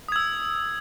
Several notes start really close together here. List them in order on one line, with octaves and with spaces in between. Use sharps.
D#6 G#6 E6